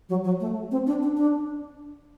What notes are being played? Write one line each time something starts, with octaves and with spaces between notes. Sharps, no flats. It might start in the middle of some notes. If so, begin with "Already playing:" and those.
F#3
F#3
A3
C4
D4
D4
D4